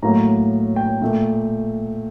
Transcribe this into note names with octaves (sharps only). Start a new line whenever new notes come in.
A2 F#3 A#3 A#5
G5
A#2 A3